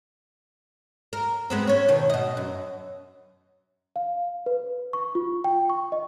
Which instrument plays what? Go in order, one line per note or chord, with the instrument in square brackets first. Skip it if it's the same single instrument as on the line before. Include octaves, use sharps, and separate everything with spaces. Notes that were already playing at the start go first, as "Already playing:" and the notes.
[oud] A#4
G#3 B3 C4
C#4 C#5
B2 D#3
B2 D#5
F#2
[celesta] F5
B4
C#6
F4
G5
C#6
D#5